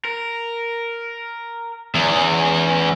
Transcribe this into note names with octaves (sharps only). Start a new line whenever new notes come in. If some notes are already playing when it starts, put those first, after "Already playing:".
A#4
E2 C#4 E5